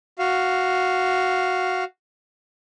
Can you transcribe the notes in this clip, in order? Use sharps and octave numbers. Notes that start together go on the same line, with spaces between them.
F#4 F5